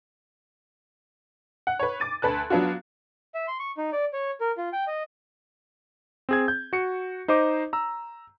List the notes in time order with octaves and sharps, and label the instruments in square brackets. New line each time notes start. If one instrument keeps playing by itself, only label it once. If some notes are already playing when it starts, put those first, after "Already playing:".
[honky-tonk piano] F#5
B4 C#5
D6 A6 D#7
D2 B4 A5 F#6
F#3 B3 D4 F4 F#4
[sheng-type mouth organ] E5
C6
C#6
D#4
D5
C#5
A#4
F4
G5
D#5
[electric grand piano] C4 G#4 G#6
G6
F#4 C#7
D#4 C5 D#5 D6
A#5 E6